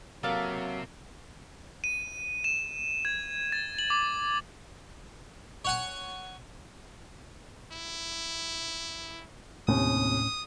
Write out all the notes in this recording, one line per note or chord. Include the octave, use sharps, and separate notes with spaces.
C3 F#3 A#3 C4 A4 E5 F5
D#7
E7
G#6
A6
F#7
D6
C#5 F#5 G#5
E4
D#2 A2 C3 C#4 D#6